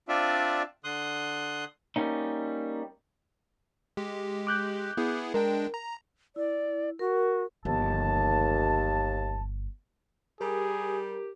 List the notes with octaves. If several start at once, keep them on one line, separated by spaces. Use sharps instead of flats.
C4 D4 F4 D5 E5
D3 C6 D#6 F#6
G3 A#3 C#4 D#4
G#3 G4
D6 F#6 G6
B3 E4 G#4
G#3 D4 A#4 G5
A#5
E4 D5
F#4 A#4
G1 D#2 F3 A5
G3 G4 G#4 A#4